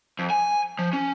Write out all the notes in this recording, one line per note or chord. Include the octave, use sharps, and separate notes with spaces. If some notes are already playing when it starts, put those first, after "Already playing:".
F2
G#5
F3
C#4